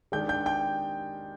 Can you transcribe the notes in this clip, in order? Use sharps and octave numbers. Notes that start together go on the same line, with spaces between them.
D#3 G#3 D4 G5 G6
G5 G6
G5 G6